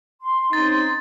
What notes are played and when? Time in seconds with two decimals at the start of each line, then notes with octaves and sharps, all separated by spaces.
0.21 C6
0.53 C4 C#4 D#4 A6